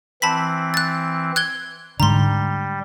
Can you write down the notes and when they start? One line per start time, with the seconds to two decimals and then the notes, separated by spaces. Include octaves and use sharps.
0.22 E3 C4 A5 B5 B6
0.74 F#6 A6
1.36 F#6 G#6 G7
2.00 G#2 D3 G3 A#5 C6